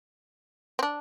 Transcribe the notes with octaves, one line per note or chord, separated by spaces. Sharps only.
C4
D4